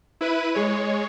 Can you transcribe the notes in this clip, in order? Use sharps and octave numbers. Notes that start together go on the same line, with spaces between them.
E4 B4 D#7
G#3 C#5